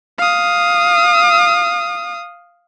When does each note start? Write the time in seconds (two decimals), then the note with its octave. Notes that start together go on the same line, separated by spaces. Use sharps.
0.18 F5 D#6